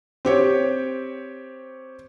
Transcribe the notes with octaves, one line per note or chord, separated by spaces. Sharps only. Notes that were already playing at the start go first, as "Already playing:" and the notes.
C4 G4 C#5